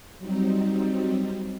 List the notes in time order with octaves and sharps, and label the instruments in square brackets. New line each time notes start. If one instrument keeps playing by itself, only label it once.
[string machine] F#3 G3 C4 D#4